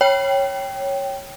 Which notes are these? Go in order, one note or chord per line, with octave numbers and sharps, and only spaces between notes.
C#5 G5